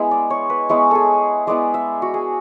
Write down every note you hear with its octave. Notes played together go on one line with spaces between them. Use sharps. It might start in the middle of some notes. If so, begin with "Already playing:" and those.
Already playing: G#3 B3 E4
D5
C#5
B4
G#3 B3 E4 C#5
G#4 A4
G#3 B3 E4 D5
E5
F#4
G#4